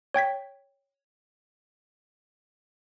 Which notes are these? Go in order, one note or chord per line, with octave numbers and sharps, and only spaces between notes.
C#5 G5 G#6 B6